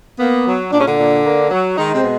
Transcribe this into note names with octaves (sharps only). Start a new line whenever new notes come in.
A#3 B3
F#3
A#2 D4
C#4
D3 D4
A#2
A#3
F#3
D#3 G#3 D#4
C3 C4
B2